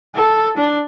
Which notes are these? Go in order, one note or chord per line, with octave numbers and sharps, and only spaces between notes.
A4
D4